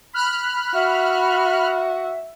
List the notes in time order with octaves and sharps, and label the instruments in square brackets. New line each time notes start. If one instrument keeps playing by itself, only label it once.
[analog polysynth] B5 F6 F#6
[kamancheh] F#4 [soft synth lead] E5